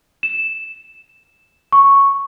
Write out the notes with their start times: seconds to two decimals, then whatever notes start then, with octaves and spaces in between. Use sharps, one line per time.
0.23 E7
1.72 C#6